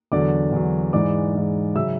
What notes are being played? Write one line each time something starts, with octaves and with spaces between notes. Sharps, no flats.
E2 D3 F#3 D5 D6
E2 D3 F#3
G#2 E3 D5 D6
G#2 E3
C#3 F#3 E5 E6